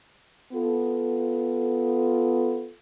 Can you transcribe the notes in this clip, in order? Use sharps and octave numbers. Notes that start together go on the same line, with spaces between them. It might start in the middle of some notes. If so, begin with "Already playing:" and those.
B3 F4 A4